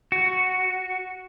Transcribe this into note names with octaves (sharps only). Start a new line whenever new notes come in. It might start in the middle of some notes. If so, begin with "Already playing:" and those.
F#4